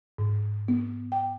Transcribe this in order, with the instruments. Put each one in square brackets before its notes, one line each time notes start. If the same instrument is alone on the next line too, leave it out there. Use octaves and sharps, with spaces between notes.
[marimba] G#2
B3
G5